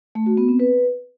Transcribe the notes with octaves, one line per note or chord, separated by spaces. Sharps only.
A3
F#4
B3
C4
B4